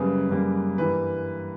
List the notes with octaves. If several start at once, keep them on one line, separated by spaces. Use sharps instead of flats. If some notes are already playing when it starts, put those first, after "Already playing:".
Already playing: F#2 C#3 G3 A#3 B4
F#2 C#3 G3 A#3
G2 E3 G3 A#3 B4